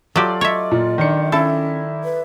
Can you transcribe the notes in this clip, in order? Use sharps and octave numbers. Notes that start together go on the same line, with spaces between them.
F#3 F4 G4 A4 D5
C#5 D#5 E5
A#2
D#3 D4 C#7
C#4 E4 A4
B4